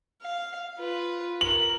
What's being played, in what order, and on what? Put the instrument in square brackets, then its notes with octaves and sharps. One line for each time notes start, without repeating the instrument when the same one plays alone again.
[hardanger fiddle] F5
F4 B4
[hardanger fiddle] A#4 [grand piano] F#7